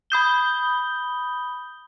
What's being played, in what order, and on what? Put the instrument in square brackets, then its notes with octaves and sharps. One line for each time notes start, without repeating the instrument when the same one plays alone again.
[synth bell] B5 D#6 G6 G7